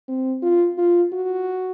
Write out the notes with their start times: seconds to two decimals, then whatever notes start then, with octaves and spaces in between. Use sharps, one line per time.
0.08 C4
0.43 F4
0.78 F4
1.13 F#4